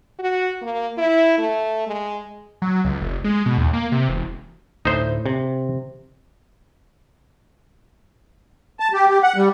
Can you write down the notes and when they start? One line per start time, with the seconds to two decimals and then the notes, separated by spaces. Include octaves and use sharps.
0.19 F#4
0.61 A#3
0.98 E4
1.38 A3
1.87 G#3
2.62 F#3
2.85 C#2
3.02 F1
3.24 G#3
3.46 B2
3.58 D#2
3.73 A#3
3.92 C3
4.09 E1
4.85 D2 A2 D#4 C5
5.26 C3
8.80 A5
8.93 G4
9.08 G4
9.23 F#5
9.36 G3